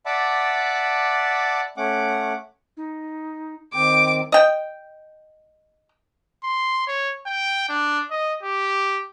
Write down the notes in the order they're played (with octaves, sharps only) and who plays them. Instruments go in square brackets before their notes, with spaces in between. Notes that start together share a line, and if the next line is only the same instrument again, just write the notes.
[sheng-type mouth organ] D5 E5 F#5 A5 B5 D6
A3 C#4 F#5 D6
[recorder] D#4
[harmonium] D#3 C4 [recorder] G5 [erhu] D6
[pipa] D#5 G5
[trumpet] C6
C#5
G5
D4
D#5
G4